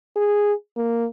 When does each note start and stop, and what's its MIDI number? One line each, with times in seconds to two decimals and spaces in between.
0.16 0.53 68
0.77 1.06 58